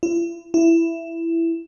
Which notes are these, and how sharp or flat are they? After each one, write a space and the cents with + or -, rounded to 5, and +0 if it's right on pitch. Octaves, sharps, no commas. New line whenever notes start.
E4 +40
E4 +10